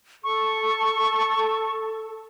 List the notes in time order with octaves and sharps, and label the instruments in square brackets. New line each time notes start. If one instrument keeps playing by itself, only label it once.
[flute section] A4 [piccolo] C#6